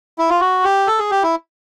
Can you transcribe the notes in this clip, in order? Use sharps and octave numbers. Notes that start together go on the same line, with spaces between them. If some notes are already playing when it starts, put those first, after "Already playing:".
E4
F4
F#4
G4
A4
G#4
G4
E4